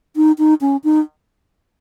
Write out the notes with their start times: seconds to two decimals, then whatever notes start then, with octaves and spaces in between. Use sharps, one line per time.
0.16 D#4
0.39 D#4
0.61 C#4
0.84 D#4